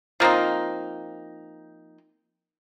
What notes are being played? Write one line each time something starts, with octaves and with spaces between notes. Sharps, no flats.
F3 A#3 C4 D#4